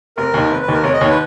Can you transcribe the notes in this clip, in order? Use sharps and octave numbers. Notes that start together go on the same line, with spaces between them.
F1 A#4
D#2 D#3
F1 B4
B4
D#2 D#3 A#4
F1 C#5
D#5
D#2 D#3 C#5
B4